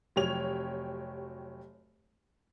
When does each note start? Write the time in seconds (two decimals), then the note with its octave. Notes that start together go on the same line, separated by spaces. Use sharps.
0.16 F1 F#3 G4 C#5 F7